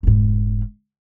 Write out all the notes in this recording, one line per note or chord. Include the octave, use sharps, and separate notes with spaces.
F1 G#2